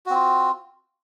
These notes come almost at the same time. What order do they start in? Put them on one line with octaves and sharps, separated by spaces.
F#4 C4 F4